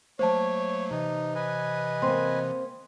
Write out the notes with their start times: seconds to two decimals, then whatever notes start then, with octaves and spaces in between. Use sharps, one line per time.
0.19 F#3 A3 A#3 C5 C#5 A5
0.91 C3 E3 D#4
1.35 B4 D#5 G#5
2.02 A#3 C4 C6